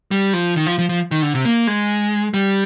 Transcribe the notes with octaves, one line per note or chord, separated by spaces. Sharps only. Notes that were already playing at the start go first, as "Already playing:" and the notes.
G3
F3
D#3
F3
F3
F3
D#3
D3
C3
A#3
G#3
G3